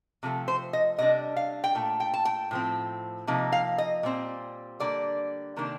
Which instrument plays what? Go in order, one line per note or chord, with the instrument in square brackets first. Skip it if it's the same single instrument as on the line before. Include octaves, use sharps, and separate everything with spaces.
[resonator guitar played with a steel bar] C3 F3 A3
C5
D#5
C3 G3 D4 D#5
F5
G5
A#2 A3
G5
A5
G5
A2 F3 C4
C3 F3 A#3 D#4
F5
D#5
A#2 G3 C4
D3 G3 A#3 D5
C3 D#3 A#3 D4